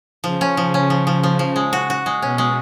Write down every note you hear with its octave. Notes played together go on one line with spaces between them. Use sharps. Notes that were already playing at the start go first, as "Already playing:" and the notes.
C#3 F3
C#4
C#3 F3
C#4
F3
F3
F3
F3
G#3
F#4
F#4
G#3
B2 C#4
G#3